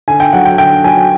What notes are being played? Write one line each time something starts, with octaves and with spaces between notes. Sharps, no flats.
D3 G#5
G5
F#3 F#5
G5
D3 G5
F#3 G#5